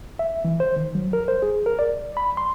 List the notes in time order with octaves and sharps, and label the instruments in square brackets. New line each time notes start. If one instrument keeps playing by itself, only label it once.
[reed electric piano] E5
E3
C5
D#3
F#3
A#4
C5
G#4
A#4
D5
B5
C6